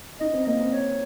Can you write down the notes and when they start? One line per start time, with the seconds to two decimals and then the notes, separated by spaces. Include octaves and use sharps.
0.20 D#4 D#5
0.33 C4
0.47 A#3 D#5
0.60 C4
0.73 C#5